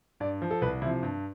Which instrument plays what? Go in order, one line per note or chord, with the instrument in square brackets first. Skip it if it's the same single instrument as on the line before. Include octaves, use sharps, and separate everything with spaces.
[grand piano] G2 D5
F3
A4
C2 B4
C3 F3 E4
G2